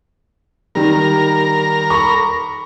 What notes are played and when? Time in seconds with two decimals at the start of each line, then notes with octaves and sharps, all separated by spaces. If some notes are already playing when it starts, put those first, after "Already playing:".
0.75 D#3 G3 A#4
1.90 B5 C#6